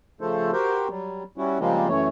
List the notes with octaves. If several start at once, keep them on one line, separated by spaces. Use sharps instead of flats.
C#3 F3 A3 A4 C5
F#4 G4 A#4 C5 G5
F#3 G3
G3 C#4 E4 F#4
C#3 F3 G3 G#3 A#3 C4
F#2 E3 A3 C#5